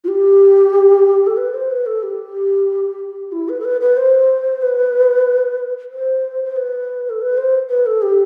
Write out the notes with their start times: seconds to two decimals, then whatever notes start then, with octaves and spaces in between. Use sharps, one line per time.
0.04 F4
0.08 G4
1.27 A4
1.37 B4
1.54 C5
1.70 B4
1.86 A4
2.03 G4
3.32 E4
3.49 B4
3.60 A4
3.65 B4
3.81 B4
3.97 C5
4.62 B4
5.91 C5
6.44 C5
6.56 B4
7.10 A4
7.21 B4
7.37 C5
7.70 B4
7.86 A4
8.02 G4